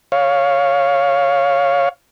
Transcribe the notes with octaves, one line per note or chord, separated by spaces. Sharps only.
C#5 F5